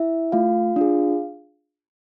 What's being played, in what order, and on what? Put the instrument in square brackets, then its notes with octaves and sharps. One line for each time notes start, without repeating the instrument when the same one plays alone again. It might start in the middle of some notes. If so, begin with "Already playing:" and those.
Already playing: [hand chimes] E4 E5
A3 F4 F5
D4 F4 G#4